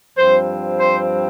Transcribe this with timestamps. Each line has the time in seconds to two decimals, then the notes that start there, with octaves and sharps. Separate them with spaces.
0.17 G2 F3 C4 C5
0.78 C5